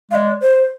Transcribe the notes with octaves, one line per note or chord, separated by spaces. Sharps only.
G#3 D5 F5
C5